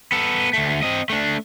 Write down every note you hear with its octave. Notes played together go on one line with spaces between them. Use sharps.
B3 A4
D2 A3
C4 D#5
A3 D4